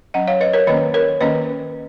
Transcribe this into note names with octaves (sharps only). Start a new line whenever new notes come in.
F#3 C#4 D#5 F#5
C#5 F5
B4 D#5
A#4 C#5
D#3 A#3 C#4 B4 D#5
A#4 C#5
D#3 A#3 C#4 B4 D#5